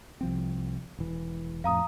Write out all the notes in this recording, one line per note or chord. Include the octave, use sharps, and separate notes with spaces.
C2 F3 C4
E1 E3
F2 A2 F5 A#5 D#6